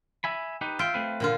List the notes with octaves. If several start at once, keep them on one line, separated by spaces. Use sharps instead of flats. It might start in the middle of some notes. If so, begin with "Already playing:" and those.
E5 G#5 B5
D#4 G4 B4
F4 E5 G5
A3 C4 B4
A#2 D3 F4